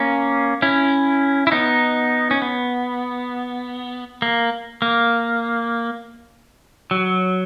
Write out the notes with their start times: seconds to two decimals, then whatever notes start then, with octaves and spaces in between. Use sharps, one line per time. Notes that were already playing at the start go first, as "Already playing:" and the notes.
Already playing: A#3 C#4
0.62 C#4 E4
1.47 E4
1.52 B3 D#4
2.31 C#4
2.42 B3
4.22 A#3
4.82 A#3
6.91 F#3